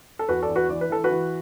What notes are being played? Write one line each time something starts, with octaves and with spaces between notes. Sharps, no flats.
A4
E2 F#4 B4
A4 D5
E2
F#4 B4
E3 D5
B4
E3 A4
F#4 B4
E3